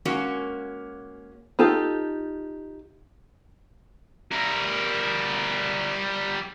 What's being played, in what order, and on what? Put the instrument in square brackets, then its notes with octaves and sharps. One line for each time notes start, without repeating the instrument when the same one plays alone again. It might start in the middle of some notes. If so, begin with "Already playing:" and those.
[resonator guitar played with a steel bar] G#3 A#3 C#4 F#4
[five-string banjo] D#4 F4 G4 A4
[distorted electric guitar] G3 A#4